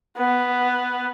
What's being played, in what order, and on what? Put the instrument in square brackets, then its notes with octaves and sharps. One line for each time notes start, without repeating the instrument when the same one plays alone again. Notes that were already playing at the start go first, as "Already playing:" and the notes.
[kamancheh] B3